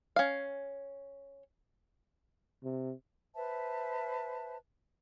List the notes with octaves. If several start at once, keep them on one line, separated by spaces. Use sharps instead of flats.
C#4 F5
C3
B4 C5 E5 A5